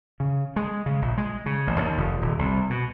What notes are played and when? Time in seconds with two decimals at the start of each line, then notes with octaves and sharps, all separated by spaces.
0.20 C#3
0.56 G#3
0.86 C#3
1.02 A#1
1.17 G#3
1.46 C#3
1.67 A1
1.80 D#2
1.98 F1
2.21 D#1
2.39 C2
2.70 B2